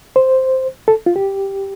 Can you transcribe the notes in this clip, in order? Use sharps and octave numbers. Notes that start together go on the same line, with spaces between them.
C5
A4
F4
G4